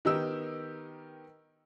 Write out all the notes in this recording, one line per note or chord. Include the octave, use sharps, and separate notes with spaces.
D#3 B3 D#4 G4 A#4 E6